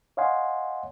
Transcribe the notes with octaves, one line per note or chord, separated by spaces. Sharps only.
C#5 D#5 F5 F#5 G#5 C6